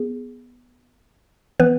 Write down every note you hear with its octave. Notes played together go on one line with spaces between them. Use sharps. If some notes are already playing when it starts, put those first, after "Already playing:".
Already playing: B3 G#4
E3 B3 B4